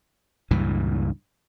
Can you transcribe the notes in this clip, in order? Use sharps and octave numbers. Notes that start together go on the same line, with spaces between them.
C#2 G2 A#2 E3